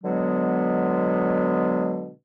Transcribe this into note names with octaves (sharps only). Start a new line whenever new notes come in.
B2 D3 F#3 G#3 B3